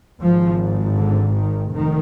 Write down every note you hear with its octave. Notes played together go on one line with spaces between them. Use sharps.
G#1 G#2 F3
D3
D#3
F1 D#3